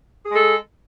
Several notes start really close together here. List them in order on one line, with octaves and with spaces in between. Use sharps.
G#4 G#3 A4